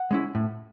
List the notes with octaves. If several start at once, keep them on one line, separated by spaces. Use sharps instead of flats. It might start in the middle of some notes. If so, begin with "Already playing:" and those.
Already playing: F#5
G#3 C#4 E4
A2